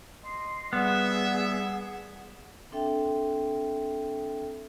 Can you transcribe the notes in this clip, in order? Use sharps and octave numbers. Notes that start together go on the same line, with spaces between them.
D#5 C6
G3 B3 G#4 E5 F#5
C4 D4 A4 E5 G5